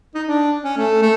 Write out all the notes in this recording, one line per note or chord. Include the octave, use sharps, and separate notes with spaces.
D#4
D4
C#4
A3
A3